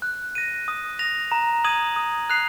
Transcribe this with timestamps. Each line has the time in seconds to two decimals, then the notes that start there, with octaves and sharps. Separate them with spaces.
0.02 F#6
0.35 A#6 D#7
0.68 D#6
0.99 A#6 F7
1.32 A#5
1.64 D#6 G#6 D#7 F#7
1.96 D#6
2.30 F#6 C7 F7